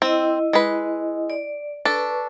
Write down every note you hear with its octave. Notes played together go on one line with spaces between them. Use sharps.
C4 E4 D#5
G#3 B4
D5
D4 A4 B4 C#6